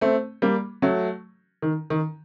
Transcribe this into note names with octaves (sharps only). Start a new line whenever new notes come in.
A3 C4
G3 A#3
F#3 A3
D#3
D#3